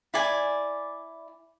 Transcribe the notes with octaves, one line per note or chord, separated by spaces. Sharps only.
E4 D5 G#5